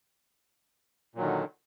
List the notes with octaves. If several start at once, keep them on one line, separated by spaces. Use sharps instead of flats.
A#2 D3 D#3 F#3